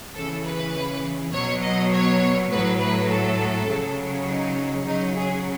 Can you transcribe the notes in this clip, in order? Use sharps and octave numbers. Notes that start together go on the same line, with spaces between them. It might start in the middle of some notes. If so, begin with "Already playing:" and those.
C#3 E3 A4
B4
B2 F#3 C#5
D#5
C#5
A2 F#3 B4
B4
A4
C#3 F#3
D#4
C#3 F#3 D#4
G#4